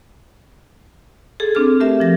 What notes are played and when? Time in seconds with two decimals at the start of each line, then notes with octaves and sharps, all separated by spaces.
1.40 G#4 A4
1.55 C4 D4 G#4 F6
1.80 A3 G4 A#4 E5
2.00 F3 A#6